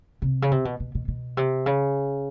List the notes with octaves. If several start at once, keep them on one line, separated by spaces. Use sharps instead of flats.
C3
C#3
C3
B2
B2
B2
B2
C3
C#3